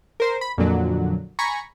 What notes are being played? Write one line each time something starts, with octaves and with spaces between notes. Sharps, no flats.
A#4 C5 C6
B5
F2 A#2 D3 F#3
G#5 A#5 B5 C#6